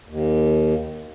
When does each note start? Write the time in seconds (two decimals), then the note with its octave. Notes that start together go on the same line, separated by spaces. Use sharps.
0.09 D#2